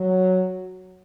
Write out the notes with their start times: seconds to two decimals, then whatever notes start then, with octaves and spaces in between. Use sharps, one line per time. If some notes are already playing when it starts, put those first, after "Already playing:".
Already playing: F#3